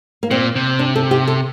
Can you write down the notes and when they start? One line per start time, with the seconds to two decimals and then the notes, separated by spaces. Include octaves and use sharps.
0.23 A#3
0.31 A#2 C4
0.55 C3
0.79 D4
0.96 A4
1.11 G4
1.27 A4